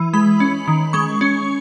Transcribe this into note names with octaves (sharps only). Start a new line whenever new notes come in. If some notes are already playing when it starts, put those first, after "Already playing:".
Already playing: E3
G#3 B5
C#4
D#3
G#3 C#6
C#4